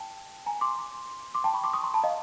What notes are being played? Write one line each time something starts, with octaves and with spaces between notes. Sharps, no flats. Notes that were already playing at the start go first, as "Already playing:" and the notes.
Already playing: G5 A5
G#5 A#5
C6 D6
C6 D6
G5 A5
B5 C#6
C6 D6
C#6 D#6
A#5 C6
A5 B5
D#5 F5